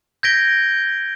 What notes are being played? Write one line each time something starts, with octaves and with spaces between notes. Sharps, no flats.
G6 G#6 A#6 B6 D7 G7